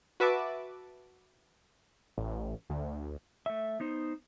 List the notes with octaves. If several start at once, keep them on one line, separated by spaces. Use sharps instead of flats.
F#4 B4 E5 A5 D6
A1
D2
A3 E5
B3 D#4 C5